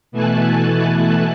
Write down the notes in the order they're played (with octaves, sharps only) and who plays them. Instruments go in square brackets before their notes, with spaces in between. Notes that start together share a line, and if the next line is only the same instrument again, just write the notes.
[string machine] B2 E3 A3 G#5 A5 F#6